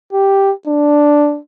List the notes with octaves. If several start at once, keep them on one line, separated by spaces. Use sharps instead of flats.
G4
D4